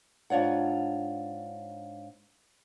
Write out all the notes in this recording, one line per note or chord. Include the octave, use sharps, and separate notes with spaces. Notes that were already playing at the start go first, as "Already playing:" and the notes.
G#2 D4 F4 C#5 F#5